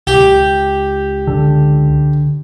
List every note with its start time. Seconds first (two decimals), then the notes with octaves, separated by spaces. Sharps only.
0.07 C#2 G4
1.27 D3